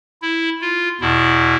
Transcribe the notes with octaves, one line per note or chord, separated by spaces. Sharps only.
E4
F4
E2 B2 E4